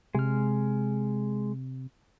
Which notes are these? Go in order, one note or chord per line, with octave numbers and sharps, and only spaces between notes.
C3 G#3 F6